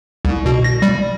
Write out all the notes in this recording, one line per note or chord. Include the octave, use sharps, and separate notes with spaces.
C2
B2
A#6
G3